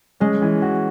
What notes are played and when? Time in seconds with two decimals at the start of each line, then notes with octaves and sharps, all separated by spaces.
0.20 G#3 C#4
0.42 E3
0.62 F#4